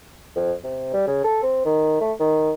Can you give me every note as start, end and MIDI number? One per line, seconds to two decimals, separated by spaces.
0.36 0.53 41
0.64 0.91 48
0.93 1.06 55
1.07 1.24 49
1.24 1.38 69
1.43 1.64 60
1.65 2.00 51
2.01 2.12 57
2.20 2.52 51